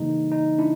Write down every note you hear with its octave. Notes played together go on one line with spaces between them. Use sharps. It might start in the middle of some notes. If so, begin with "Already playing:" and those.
Already playing: C#3 E3 G3 A#3 D#4
D#4
D4 E4